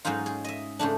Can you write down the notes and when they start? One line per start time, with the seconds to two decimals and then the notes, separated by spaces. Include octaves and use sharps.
0.05 G#2 F#3 C#4 D#4 F4
0.26 G#4
0.44 D#5 E5
0.79 G#2 C#3 A3 D4